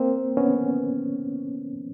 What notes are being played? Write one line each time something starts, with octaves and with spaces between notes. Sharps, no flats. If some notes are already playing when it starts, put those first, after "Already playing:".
Already playing: A#3 C4
B3 C#4